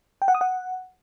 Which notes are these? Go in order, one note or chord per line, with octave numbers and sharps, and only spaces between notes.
G5
F#5
D#6
F#5